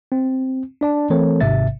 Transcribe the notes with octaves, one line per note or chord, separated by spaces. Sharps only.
C4
D4 D5 A5
E3 A3 C4 A4 A#4 C#5
G#1 G#2 C3 E5 A6